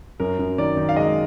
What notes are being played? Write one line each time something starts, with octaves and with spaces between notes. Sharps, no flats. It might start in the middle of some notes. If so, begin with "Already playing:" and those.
F#2 A#4
F#2
D#3 D5
D#3
F5
G#3 D#5